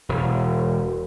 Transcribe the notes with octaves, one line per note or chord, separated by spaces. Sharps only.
E1